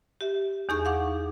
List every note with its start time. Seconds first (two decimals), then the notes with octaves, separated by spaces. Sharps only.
0.21 G4 E5
0.69 E2 D#4 G#4 C#6 G6
0.85 F5 F#5 D6